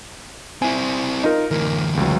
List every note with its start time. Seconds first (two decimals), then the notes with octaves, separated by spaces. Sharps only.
0.62 C4 E4 G#5
1.24 D#4 F4 A#4
1.51 D2 E3 A#4
1.97 C#2 F#3